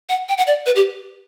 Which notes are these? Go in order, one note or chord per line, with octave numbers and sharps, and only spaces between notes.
F#5
G5
F#5
D5
B4
G4